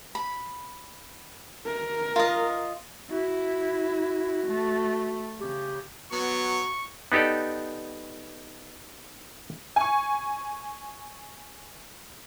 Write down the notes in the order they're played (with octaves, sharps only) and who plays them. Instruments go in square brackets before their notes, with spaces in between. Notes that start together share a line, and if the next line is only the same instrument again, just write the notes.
[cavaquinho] B5
[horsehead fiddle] A#4
[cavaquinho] F4 D#5
[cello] E4 [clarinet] F#4
[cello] A3
[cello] C#3 [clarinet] G4
[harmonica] F#3 [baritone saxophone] B3 [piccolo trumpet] C#6
[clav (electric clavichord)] B3 D#4 G4 A4 D5
[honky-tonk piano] G#5 C#6